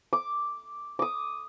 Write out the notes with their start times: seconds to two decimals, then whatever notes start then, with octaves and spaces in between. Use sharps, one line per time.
0.13 D6
0.99 D6 D#6